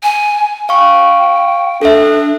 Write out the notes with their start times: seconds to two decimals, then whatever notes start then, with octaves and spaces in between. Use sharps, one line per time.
0.03 G#5
0.69 F5 G5 C#6
1.82 D4 A4 E5